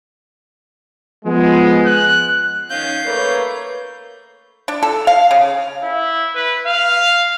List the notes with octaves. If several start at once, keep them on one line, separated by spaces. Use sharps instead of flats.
F3 G#3 B3
F#6
D#3 C#4 F5 G6
A3 A#3 A#4 B4 C#5
D4
A4
F5
C#3
E4
B4
F5